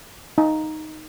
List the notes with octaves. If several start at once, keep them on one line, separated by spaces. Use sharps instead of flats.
D#4